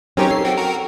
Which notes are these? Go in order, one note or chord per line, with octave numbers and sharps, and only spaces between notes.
F#3 C4 C#4 D#4 G4 A#4 C#5
A4 C7
F#4 G5
F#4 A#4